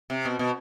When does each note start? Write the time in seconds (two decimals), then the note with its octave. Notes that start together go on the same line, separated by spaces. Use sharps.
0.10 C3
0.25 B2
0.39 B2